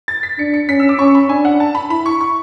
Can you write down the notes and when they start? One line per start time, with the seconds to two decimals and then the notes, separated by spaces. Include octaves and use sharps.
0.08 A6
0.23 B6
0.39 D4 C#7
0.54 C#7
0.68 C#4 B6
0.79 E6
0.89 D6
0.99 C#4 C#6
1.15 B5
1.29 D4 G#5
1.45 F#5
1.60 A5
1.75 B5
1.90 E4 B5
2.06 C#6
2.21 C#6